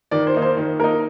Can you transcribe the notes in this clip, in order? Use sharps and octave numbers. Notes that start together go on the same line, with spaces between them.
D#3 D5
C5
A#3 D#4
C5
D#3
A#3 D#4 A#4